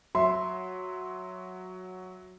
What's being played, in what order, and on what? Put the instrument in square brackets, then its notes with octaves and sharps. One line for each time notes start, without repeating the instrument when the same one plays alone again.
[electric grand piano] F#3 [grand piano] E5 [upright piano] C6